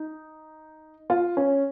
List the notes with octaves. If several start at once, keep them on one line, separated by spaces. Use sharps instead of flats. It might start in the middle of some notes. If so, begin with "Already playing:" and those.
Already playing: D#4
F4
C#4